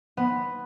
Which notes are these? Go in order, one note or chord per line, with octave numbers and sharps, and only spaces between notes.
B3